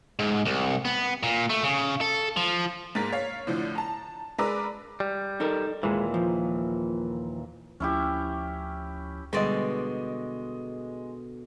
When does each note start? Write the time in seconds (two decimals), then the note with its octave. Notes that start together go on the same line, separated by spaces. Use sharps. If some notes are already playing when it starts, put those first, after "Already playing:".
0.19 G#2
0.45 C2
0.85 B3
1.23 A#2
1.50 A3
1.63 C#3
2.01 A4
2.37 F3
2.95 G#2 A#3 A#5 A6 B6
3.12 C#5 F5
3.47 A2 D3 F3
3.75 A5 A#5
4.38 G#3 A#4 B4 D5 A#5 E6
5.00 G3
5.40 D#4 A4 A#4
5.83 D#2 A#2 E3 G#3
6.14 F3
7.80 D2 F3 C#4 E4 G4
9.33 B2 D3 G3 G#3 D5 D#5 C6 A6